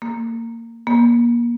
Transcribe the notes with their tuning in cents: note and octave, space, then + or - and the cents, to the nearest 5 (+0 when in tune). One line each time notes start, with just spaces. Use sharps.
A#3 -20
A#3 +30